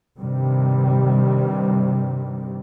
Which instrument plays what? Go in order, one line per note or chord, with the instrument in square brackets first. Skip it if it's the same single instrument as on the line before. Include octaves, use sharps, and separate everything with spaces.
[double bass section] G2 C3 D#3 G3